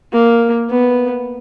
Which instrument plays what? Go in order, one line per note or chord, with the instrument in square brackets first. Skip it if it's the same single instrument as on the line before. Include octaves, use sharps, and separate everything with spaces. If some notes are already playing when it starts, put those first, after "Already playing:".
[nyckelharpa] A#3
B3